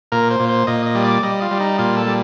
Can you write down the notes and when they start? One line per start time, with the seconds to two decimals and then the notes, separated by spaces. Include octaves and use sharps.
0.12 A#2 A#4
0.30 C5
0.40 A#2
0.49 C5
0.67 A#2 D#5
0.86 D#5
0.95 G3
1.05 D5
1.23 G3 D#5
1.41 F4
1.51 G3
1.60 D#4
1.79 A#2 F4
1.97 A4
2.06 G3